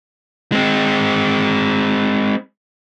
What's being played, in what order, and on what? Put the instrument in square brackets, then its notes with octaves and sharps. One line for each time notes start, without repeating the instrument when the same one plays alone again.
[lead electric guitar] G#3 C4